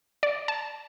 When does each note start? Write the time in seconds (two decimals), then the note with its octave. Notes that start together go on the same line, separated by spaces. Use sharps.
0.23 D5
0.48 A5